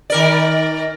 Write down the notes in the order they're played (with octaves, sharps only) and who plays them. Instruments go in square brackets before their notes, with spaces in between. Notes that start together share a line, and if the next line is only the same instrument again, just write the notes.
[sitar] D#3 A#4 D5